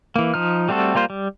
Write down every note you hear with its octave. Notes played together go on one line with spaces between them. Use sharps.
E3 A#3
F3 D#4 F6
G3 A3 C4 F#4 A4
G3 A#3 F4 C5
G3